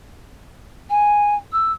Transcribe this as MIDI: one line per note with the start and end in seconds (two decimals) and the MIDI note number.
0.90 1.35 80
1.52 1.72 88